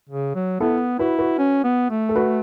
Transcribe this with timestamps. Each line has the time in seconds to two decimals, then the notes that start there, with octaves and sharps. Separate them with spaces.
0.09 C#3
0.35 F#3
0.60 B3 E4 A4
0.99 E4 F#4 B4
1.19 F#4 B4
1.38 C#4
1.64 B3
1.90 A3
2.09 A4
2.16 F#4 B4